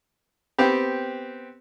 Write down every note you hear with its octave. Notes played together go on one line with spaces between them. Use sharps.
B3 C4 G4